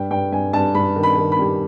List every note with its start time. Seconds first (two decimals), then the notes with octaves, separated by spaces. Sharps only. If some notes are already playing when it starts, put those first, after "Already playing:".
Already playing: G2 G5
0.11 G2 G5
0.32 G2 G#5
0.53 G2 A5
0.75 G2 B5
0.96 D#3
1.03 B5
1.17 D#3
1.32 B5
1.39 G3